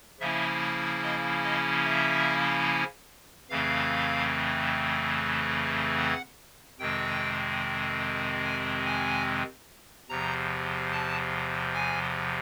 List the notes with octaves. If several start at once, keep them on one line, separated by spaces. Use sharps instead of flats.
C#3 F3 A#3 C#4 E4 E5
D#5
D#5
E5
F2 C#3 E3 A3 C4 F5
F#5
F2 C3 D#3 G#3 C4 G5
G#5
G#5
E2 C3 F3 A#5
A5
G#5